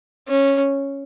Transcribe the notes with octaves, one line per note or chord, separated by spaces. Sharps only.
C#4